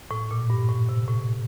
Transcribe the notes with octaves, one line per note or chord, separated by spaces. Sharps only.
A2
A#2
G2
A2
C3
A2